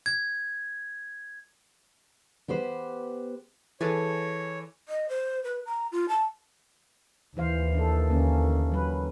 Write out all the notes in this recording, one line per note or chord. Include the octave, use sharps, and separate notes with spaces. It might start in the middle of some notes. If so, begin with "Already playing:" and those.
G#6
B3 G4 B4 C5
E3 G#4 A4 B4 C#5
D#5
C5
B4
A#5
F4
A5
D#2 E3 C5 F5
D4 A4
D3 A#3 C#4
F#3 B4